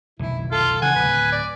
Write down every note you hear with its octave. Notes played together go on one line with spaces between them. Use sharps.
F1 B1 D#3 E4
F4 A4
C#3 E3 F#3 F#5 G#5
D1 A#1 B4
D5